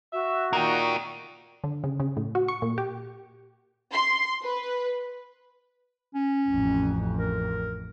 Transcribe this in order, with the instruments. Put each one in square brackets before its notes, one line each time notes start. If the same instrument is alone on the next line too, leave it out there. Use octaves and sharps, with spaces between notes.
[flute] F#4 [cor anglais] E5
[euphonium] A#2 [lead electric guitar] A#3 G5 [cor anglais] D#4
[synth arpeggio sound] D3
C#3
C#3
A2
F#4
C#6
A#2
G4
[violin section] C6
B4
[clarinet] C#4
[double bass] A1 F2
[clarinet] A#4